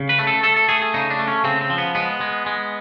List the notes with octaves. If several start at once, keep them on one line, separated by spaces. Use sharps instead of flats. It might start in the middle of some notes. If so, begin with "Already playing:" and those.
Already playing: C#3
B4
A3
A4
A3 A4
A4
A3 G#4
G#4
C#3 D#4
D4
A3
C#4
C#3 C4
C4
F3
B3
G#3 B3
G#3
G#3